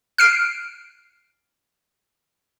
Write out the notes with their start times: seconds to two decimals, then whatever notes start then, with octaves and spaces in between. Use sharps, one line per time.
0.18 F6 C7 D7